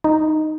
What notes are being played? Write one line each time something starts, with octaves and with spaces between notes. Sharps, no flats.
D#4